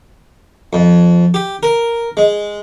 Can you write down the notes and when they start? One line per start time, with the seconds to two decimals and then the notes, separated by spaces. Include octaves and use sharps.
0.73 F2
1.34 G4
1.63 A#4
2.17 G#3